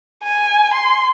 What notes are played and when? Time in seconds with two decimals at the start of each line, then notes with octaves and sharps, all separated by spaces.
0.23 G#5
0.74 C6